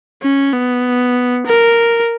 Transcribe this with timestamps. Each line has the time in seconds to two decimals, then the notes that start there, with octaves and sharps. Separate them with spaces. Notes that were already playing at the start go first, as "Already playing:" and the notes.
0.22 C#4
0.53 B3
1.46 A#4